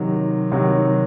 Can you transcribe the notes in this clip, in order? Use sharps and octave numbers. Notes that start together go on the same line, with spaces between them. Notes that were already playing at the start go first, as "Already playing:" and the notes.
Already playing: C3 D#3 F#3
C3 D#3 F#3